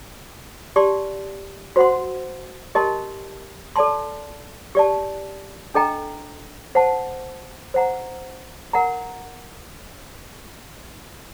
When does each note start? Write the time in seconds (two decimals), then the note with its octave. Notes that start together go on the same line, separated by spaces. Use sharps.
0.76 G4 D5 A5 C6
1.76 F#4 C5 F#5 C6
2.75 G4 A#4 D#5 A5 C6
3.76 A4 D5 A5 C6
4.75 G4 D5 A5
5.74 D4 A4 D#5 G5 A#5
6.75 C5 F#5 A5
7.74 C5 F#5 A#5
8.73 A#4 F#5 A#5